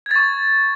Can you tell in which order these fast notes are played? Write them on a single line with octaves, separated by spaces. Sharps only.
G#6 A6 C#6